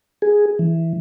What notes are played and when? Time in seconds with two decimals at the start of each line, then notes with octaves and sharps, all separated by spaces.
0.22 G#4
0.59 E3